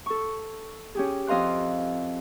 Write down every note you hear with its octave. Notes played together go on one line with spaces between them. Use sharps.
A4 C#6
C#4 G4 G#4
F2 D#5 F5 C6 F#6